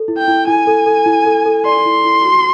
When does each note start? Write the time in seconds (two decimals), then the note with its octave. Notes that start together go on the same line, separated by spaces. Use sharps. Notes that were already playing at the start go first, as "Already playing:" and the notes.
Already playing: A4
0.08 E4
0.18 G5
0.28 E4
0.47 E4 G#5
0.67 A4
0.86 A4
1.06 E4
1.26 A4
1.46 A4
1.65 D5 C6
1.86 E4
2.05 E4
2.25 F#4